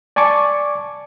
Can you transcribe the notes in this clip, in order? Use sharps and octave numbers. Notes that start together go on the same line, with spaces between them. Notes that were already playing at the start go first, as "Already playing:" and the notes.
D5 G#5 A5 C#6 D6